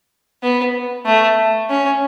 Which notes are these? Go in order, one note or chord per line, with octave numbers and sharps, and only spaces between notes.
B3
A3
C#4